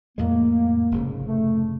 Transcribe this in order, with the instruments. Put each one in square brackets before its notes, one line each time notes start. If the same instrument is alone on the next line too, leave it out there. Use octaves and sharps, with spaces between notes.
[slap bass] F2 A2 G#3 [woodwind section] A#3
[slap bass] F1 G#2 C#3
[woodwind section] A3